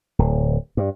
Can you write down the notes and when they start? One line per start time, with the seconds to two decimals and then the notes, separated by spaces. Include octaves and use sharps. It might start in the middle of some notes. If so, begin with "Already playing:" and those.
0.19 D1
0.77 G2